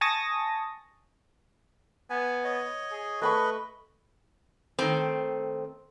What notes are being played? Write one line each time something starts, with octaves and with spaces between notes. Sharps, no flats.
G#5 A5 C#6 D#6 A6 A#6
B3 G#5
C#5 D#5
G#4
A3 B4 D#5 B5 C#6
D#3 A3 C4